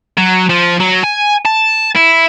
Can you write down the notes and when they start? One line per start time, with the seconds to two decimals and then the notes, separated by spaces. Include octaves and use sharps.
0.18 F#3
0.49 F3
0.80 F#3
1.03 G#5
1.45 A5
1.96 E4